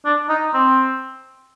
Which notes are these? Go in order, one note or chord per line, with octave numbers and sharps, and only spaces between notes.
D4
D#4
C4